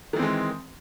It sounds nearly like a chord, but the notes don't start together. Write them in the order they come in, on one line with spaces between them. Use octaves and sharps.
D#3 E3 C4 G#3